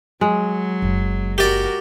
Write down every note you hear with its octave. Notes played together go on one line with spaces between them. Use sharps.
F#3 G#3
F#1
F#4 G4 A#4 D5